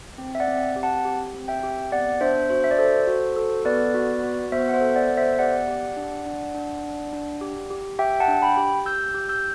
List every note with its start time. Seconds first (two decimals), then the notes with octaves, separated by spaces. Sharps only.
0.18 C4
0.35 E5
0.40 D5 F#5
0.48 C4
0.76 G4
0.83 F#5 A5
1.05 G4
1.34 C4
1.48 E5 G5
1.63 G4
1.92 B3 D5 F#5
2.21 D4 C5 E5
2.50 F#4 C5
2.64 E5
2.71 D5
2.78 A4 C5
3.07 F#4
3.36 A4
3.65 B3 B4 D5
3.94 F#4
4.23 F#4
4.52 B3 C5 E5
4.69 F#5
4.73 C5 E5
4.81 A4
4.96 D5 F#5
5.10 B3
5.17 C5 E5
5.39 G4 D5 F#5
5.68 G4
5.97 D4
6.26 D4
6.55 D4
6.84 D4
7.13 D4
7.41 G4
7.71 G4
7.99 G4 E5 G5
8.20 F#5 A5
8.28 D4
8.42 G5 B5
8.57 G4
8.86 G4 E6 G6
9.14 G4
9.29 E6 G6